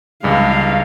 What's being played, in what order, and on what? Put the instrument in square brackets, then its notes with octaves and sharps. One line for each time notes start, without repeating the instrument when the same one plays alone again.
[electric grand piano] C#2 G2 G#3 [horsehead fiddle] F5